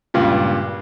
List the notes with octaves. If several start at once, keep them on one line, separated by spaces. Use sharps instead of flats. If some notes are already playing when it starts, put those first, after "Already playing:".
C#2 G2 A#2